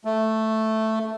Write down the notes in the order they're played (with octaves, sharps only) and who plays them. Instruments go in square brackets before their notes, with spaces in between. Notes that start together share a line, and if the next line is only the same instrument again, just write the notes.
[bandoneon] A3